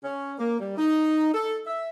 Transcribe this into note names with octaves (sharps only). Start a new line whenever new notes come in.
C#4
A#3
G3
D#4
A4
E5